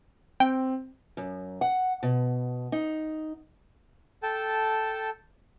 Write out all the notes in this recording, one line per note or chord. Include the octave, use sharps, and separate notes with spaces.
C4 G5
F#2
F#5
B2
D#4
A4 G5 A5